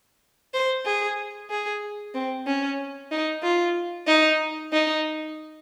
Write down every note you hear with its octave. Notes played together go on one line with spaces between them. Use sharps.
C5
G#4
G#4
C4
C#4
D#4
F4
D#4
D#4